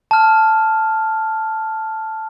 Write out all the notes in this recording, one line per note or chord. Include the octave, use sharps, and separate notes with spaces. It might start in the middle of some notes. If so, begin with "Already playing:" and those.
A5 F6